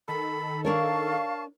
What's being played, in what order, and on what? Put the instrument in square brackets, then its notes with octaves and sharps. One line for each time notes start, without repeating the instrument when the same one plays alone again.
[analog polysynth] D#3 A4 [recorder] B5
[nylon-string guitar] D4 A#4 C#5 [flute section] F5 C#6 [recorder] A5